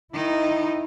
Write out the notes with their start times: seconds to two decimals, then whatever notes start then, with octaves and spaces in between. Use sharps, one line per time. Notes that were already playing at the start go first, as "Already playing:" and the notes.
0.14 D#3 D#4 E4